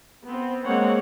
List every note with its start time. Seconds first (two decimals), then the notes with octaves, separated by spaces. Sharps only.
0.25 B3 C4
0.64 G#3 A#3 C4 C#5 F#5